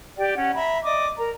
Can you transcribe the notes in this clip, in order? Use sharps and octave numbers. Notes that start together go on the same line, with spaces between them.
G4 D5 G5
C#4 F#5
E5 A#5 B5
D5 D#5 D6
A#4 A#5